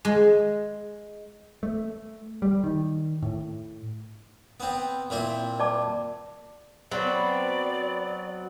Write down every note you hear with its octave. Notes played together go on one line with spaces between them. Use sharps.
G#3
A3
G3
D#3
A2
B3 C4
A#2 C4 E4
D5 A5 D6
F#3 B3 C4 D5